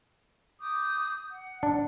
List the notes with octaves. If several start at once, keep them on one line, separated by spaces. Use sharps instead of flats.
D6 D#6 G6
F#5
D4